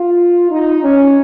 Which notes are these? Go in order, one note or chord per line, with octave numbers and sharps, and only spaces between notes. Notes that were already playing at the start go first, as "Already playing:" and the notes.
Already playing: F4
D#4
C#4